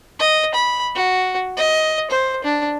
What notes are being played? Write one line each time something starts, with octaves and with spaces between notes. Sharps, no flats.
D#5
B5
F#4
D#5
C5
D4